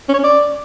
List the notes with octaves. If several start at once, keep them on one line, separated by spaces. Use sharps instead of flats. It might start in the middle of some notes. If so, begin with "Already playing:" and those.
C#4
C#5
C#4
D5